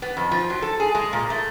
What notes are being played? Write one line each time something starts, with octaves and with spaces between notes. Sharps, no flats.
B3
F2
F3
F#3
A4
G#4
G#3
A#2
A3